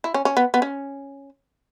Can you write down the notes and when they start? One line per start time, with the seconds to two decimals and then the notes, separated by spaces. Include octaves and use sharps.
0.04 E4
0.14 C#4
0.25 C#4
0.37 B3
0.54 B3
0.62 C#4